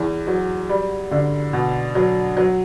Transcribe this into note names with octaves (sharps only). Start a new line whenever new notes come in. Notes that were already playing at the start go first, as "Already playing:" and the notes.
Already playing: E2
F#3
G3
D3
B2
F#3
F#3